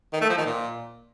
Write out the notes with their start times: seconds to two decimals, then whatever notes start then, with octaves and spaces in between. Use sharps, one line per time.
0.13 D#3
0.21 A3
0.29 F3
0.38 D#3
0.46 A#2